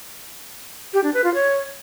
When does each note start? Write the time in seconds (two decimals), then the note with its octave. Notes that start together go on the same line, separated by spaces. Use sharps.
0.94 G4
1.04 D4
1.14 B4
1.24 F4
1.34 C#5